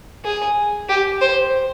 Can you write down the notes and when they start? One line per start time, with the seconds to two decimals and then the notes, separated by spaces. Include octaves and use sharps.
0.25 G#4
0.89 G4
1.21 C5